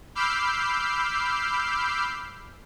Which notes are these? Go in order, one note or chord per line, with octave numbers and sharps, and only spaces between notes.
B5 D6 E6 F6 G6 C7